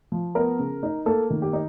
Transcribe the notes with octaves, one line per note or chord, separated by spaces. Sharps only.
F3
B3 A#4
C#3
D#4
A#3 A4
D#3
G4
D#4